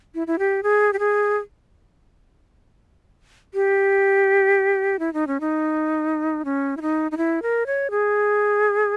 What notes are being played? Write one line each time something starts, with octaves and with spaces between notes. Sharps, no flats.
E4
E4
G4
G#4
G4
G#4
G4
E4
D#4
C#4
D#4
C#4
E4
D#4
D#4
E4
A#4
C#5
G#4